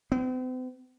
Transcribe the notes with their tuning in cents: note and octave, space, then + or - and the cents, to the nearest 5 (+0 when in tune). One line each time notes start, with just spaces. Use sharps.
C4 -45